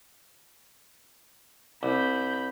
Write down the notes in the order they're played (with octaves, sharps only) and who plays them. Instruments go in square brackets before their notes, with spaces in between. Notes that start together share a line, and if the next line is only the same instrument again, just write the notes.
[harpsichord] C2 [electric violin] B5 G6